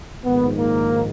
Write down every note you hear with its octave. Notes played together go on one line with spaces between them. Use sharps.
A#1 G#2 D#3 B3
A#3